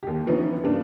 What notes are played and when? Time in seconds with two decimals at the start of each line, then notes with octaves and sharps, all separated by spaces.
0.03 D#2 G4
0.26 D3 E3 F3 B3 C#4 D#4
0.64 G2 C#3 G3 A#3 D4